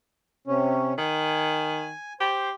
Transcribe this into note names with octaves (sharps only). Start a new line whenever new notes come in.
C3 C#4
D#3 G#5
G4 C5